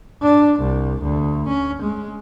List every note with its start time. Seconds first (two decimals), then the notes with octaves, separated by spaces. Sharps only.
0.22 D4
0.60 C2
1.03 D2
1.48 C#4
1.83 G#3